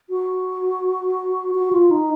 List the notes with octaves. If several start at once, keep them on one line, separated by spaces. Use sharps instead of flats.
F#4
F#4
F4
D#4